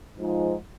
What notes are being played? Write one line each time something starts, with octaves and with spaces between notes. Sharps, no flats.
G#2 F3